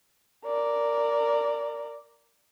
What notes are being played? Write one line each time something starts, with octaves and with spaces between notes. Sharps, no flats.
A#4 D5